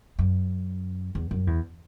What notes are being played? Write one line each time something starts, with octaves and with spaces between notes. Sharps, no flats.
F#2
E2
F#2
E2